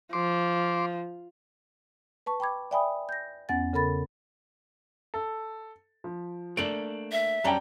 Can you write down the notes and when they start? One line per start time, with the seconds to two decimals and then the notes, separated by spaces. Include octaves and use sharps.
0.13 F3 C6 D6
2.26 B4 A5 C#6
2.40 G5 B5 D6 G#6
2.71 D5 E5 G5 G#5 B5 D#6
3.09 G6 A#6
3.49 E2 B3 C#4 F#5 G#5 A6
3.73 C#3 A4 A#4 B5 A6
5.14 A4
6.04 F3
6.57 A3 A#3 D4 D7 F#7
7.12 E5
7.44 F#2 G3 C#4 G5 A5 A#5